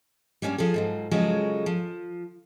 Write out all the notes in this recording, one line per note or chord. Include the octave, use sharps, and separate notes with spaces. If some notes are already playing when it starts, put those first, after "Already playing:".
G3 A#3 C#4 D4 G4
F3 G#4 A4
G#2 F3 F#3
C#3 F3 F#3 G#3 G#4 A4
F3